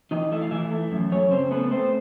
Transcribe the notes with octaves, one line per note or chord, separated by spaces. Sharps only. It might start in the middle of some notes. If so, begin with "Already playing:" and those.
E3 D#4 D#5
A3 E4 E5
F5
E3 E4 E5
A3
F#2
F#2 C#4 C#5
C#3 C4 C5
A3 B3 B4
A3 C4 C5